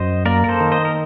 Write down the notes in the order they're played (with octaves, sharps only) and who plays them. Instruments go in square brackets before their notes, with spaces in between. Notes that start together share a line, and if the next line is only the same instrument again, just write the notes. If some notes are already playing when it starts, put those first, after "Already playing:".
Already playing: [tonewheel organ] F#2 [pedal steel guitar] C5 D#5
[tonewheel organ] A#3 [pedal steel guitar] A#4 D5
[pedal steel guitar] A#4
A4 C5
[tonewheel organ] D#3
[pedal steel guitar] C5 D#5
A#4